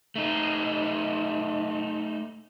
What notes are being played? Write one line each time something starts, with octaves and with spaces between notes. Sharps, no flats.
A3 D#4